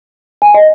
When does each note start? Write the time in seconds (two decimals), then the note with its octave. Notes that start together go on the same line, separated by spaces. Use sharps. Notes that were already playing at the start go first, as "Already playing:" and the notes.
0.42 G#5
0.54 D#5